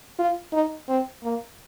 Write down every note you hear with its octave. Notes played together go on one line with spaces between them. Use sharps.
F4
D#4
C4
A#3